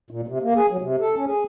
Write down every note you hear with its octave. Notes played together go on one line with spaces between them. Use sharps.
A#2
C3
A#3
G#4
F#3
C3
A4
C#4
G#4